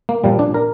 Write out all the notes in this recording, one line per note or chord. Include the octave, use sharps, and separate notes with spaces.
A#3
A#2 F3 G3
D4
A#4